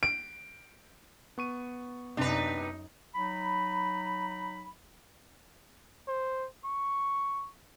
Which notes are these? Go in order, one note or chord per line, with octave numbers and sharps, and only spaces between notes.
D7
B3 C#6 D#7
F#2 C3 D4 D#4 B4 A#5
F#3 D#4 B5
C5
C#6